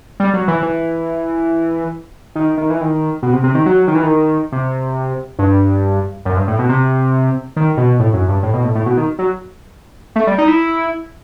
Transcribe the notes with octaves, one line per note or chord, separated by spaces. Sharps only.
G3
F#3
E3
E3
D#3
D#3
E3
D#3
B2
C3
C3
D#3
F#3
D#3
E3
D#3
C3
G2
F#2
G2
A2
B2
C3
D#3
B2
A2
F#2
G2
A2
B2
A2
A2
B2
D#3
F#3
A3
G3
D#4
E4